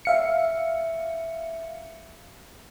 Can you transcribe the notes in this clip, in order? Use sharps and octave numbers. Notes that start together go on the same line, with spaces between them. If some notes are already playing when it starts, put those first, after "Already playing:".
E5 F5 C#7